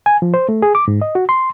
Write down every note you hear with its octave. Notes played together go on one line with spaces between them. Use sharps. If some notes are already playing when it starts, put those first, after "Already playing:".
G#5
F3
C5
A3
G#4
D6
G#2
D#5
F#4
C6